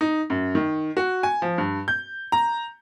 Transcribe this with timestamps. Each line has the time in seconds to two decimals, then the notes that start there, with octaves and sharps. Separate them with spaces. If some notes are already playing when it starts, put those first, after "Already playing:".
0.01 D#4
0.30 F#2
0.55 D#3
0.97 F#4
1.23 G#5
1.42 F3
1.58 G2
1.88 G6
2.32 A#5